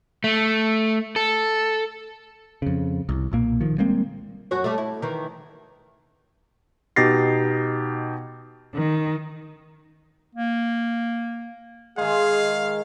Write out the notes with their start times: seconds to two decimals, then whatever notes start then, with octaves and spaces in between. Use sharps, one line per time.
0.24 A3
1.16 A4
2.62 F2 C#3
3.09 C2
3.32 B1 A#2 A#3
3.61 D#3 F3
3.78 G3 G#3 A#3 C4
4.51 F#2 F#4 C#5
4.64 G3 A3
4.78 E4
5.02 D#3 E3
6.96 B2 D#4 G4 A6 A#6 C7
8.74 D#3
10.35 A#3
11.97 D#3 G#3 G#4 F5